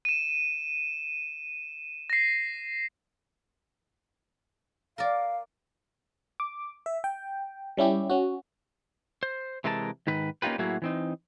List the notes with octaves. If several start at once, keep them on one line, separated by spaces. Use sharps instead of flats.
D#7 E7
A#6 C7
A#4 D5 F5
D6
E5
G5
G3 C#4 E4 G4
C#4 F#4
C5
C3 E3 G#3 A#4 G#5 A5
G#2 D#3 B4
A#3 C#4 D#4 F4 G4 B4
A2 F#3 A#3 E4 F#4 G#4
E3 C4 D#4